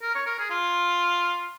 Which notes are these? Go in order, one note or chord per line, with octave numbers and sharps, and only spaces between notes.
A#4
C#5
A#4
G#4
F4